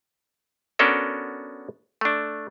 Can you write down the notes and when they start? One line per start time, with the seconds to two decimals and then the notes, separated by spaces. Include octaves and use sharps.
0.79 B3 C#4 D4 F#4 A4 A#4
2.01 A3 D4